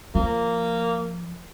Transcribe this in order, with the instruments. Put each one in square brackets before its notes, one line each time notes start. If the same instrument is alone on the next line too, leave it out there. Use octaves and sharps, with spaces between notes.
[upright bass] F3 [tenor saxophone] A#3